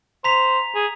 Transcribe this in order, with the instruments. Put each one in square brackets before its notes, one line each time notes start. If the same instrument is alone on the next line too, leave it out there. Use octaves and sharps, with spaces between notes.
[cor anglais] C5 [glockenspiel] A#5 B6 F7
[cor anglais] G#4